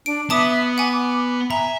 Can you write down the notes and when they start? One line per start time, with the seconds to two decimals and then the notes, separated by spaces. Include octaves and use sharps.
0.06 D4 D7
0.30 B3 E5 A5 D6 D#6
0.78 F#5 G#5 D6
0.92 D6
1.51 E5 G#5 A#5